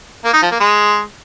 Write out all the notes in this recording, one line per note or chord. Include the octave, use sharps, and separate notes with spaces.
A#3
D#4
F3
A#3
G#3